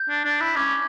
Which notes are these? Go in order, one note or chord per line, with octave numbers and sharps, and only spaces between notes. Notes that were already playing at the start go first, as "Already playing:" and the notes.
Already playing: G6
D4
D4
E4
C#4 D6